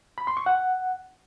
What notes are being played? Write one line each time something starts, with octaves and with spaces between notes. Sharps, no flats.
B5
C6
C#6
F#5